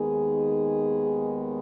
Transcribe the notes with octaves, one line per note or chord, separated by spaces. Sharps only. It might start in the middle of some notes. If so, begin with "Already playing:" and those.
Already playing: D#2 D#3 G#3 B3 G#4